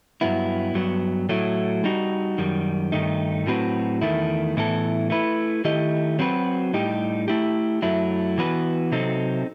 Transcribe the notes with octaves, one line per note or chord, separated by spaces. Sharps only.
G2 F#3 B3 E4
G2 F#3 B3
A2 F#3 A3 E4
G3 D#4 F#4
F#2 D#3 G3
G2 D#3 A3 D#4
A2 F#3 C4 F#4 B4
E2 D#3 A3 E4
A2 E3 B3 E4 A4
A3 E4 B4
D#3 A3 E4 G4 D#5
F#3 C4 F#4 B4
A2 G3 D#4 G4
A3 E4 G4
F#2 F#3 A3 E4
E3 B3 F#4 B4
C3 F#3 C4 D#4 A4